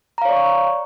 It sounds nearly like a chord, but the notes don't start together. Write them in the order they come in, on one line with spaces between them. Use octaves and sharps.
A#5 F5 C#5 D5 C#6